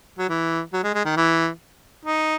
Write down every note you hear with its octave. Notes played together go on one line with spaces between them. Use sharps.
F#3
E3
F#3
G#3
G#3
D#3
E3
D#4